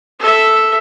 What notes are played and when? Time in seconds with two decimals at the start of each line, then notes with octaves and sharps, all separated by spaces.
0.20 A4 E5